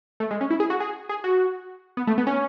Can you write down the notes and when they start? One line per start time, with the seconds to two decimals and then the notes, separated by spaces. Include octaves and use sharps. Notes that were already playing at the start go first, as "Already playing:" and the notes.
0.20 A3
0.31 G#3
0.41 C#4
0.50 E4
0.60 G#4
0.70 F#4
0.80 G#4
1.09 G#4
1.24 F#4
1.97 B3
2.07 A3
2.18 B3
2.27 C#4